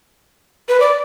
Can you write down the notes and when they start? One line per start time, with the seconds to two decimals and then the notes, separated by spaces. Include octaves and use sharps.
0.69 B4
0.80 D5